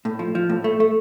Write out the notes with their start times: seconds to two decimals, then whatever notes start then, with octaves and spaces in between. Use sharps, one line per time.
0.05 A2
0.19 F3
0.35 F3
0.49 A2
0.64 A3
0.80 A3